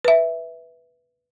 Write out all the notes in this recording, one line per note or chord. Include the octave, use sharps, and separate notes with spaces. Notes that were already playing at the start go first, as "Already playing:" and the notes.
B4 E5